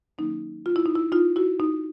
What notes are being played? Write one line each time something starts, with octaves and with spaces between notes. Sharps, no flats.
D#3 F#3 A#3 C#4 D#4
F4
E4
D#4
E4
D#4 F4
E4 F#4
D#4